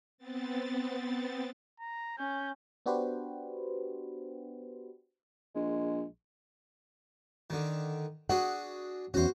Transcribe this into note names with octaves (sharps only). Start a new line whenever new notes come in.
B3 C4 A6
A#5
C#4 G6
B3 D4 F#4 G4 B4 C5
A#1 G#3
D3 D#3
D4 F#4 G#4 F#5
E2 C#4 F#4 C5